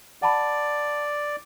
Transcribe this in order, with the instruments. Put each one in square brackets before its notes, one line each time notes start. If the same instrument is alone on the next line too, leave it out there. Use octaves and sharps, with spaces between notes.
[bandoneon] D5 [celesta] F#5 A5 B5